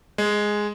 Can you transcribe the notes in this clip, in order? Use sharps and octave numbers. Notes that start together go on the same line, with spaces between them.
G#3